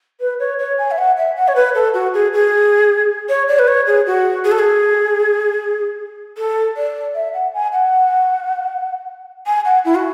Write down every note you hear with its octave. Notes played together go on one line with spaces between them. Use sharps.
B4
C#5
C#5
G#5
E5
F#5
E5
F#5
C#5
B4
A4
F#4
G#4
G#4
C#5
D5
B4
C#5
G#4
F#4
G#4
A4
G#4
A4
D5
E5
F#5
G#5
F#5
G#5
F#5
E4
F#4